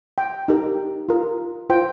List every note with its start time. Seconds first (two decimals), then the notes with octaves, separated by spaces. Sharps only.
0.18 G5
0.48 D#4 G4 A#4
1.09 F4 A#4
1.70 F4 C5 G5